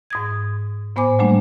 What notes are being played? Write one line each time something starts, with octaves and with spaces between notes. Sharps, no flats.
G#2 D#6 G#6
A2 B3 C5 G#5 D6
F#3 G3 A3 A#3 D4